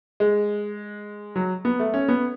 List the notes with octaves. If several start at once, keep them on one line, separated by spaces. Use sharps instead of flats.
G#3
F#3
B3
A3
C#4
B3